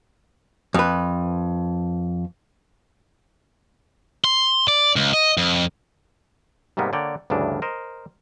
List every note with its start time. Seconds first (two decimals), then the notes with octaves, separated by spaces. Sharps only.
0.74 F2 B4
4.24 C6
4.68 D5
4.96 C#2
5.14 D#5
5.37 F2
6.77 G#2 C3 G3 A#3 B3
6.93 D3 A#3 C#5 D5 G5
7.30 D2 G2 C#3 E3 D4
7.62 A#4 C5 D#5